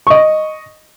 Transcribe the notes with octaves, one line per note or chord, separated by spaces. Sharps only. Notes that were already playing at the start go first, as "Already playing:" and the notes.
D#5 C#6